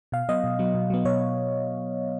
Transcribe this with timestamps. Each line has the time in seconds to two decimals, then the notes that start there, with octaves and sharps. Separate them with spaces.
0.12 B2 F5
0.29 F#3 B3 D#5
0.44 B2
0.59 F#3 B3
0.75 B2
0.90 F#3 B3
1.05 B2 C#5